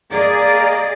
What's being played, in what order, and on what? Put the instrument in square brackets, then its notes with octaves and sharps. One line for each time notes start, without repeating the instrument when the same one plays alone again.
[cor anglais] A#3 [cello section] G#4 D5 D#5